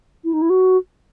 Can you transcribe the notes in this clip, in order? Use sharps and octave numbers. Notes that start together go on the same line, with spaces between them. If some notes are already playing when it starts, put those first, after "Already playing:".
E4
D#4
E4
F#4